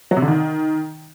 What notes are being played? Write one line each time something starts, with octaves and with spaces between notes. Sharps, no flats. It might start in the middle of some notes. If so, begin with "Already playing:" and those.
F#3
C3
D3
D#3